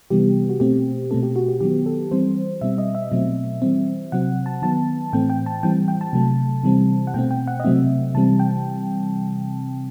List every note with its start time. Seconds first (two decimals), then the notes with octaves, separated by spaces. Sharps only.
0.10 C3 E3 G3 B3 G4
0.49 F#4
0.60 B2 A3 C4 G4
1.11 B2 A3 C4 A4
1.23 G4
1.36 F#4
1.49 G4
1.60 D#3 F#3 B3 G4
1.86 A4
2.11 E3 G3 C4 C5
2.61 B2 G3 C4 E5
2.78 D#5
2.95 E5
3.12 B2 F#3 A3 C4
3.62 E3 G3 C4
4.12 C3 F#3 C4 F#5
4.46 A5
4.62 D#3 F#3 B3 A5
5.13 A2 E3 A3 C4 G5
5.30 G5
5.46 A5
5.63 E3 G3 C4 G5
5.88 G5
6.01 A5
6.13 C3 F#3 A3
6.63 C3 E3 G3 C4
7.07 F#5
7.14 B2 A3 C4 G5
7.31 G5
7.48 F#5
7.60 D#5
7.64 C3 F#3 A3 C4 E5
8.14 C3 E3 G3 C4 A5
8.39 G5